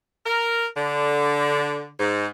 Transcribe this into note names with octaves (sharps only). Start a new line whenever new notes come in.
A#4
D3
G#2